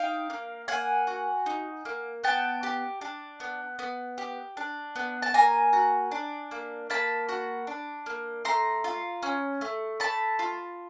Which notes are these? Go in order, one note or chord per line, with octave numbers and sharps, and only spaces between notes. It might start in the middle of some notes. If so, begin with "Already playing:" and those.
Already playing: D#4 F5 G5
A#3
A#3 F#5 G#5
F#4
D#4
A#3
B3 G5 A5
G4
D4
B3
B3
G4
D4
B3
A5
A#3 G#5 A#5
F#4
D4
A#3
A#3 A5 B5
F#4
D4
A#3
A3 A#5 C6
F4
C#4
A3
A3 A5 B5
F4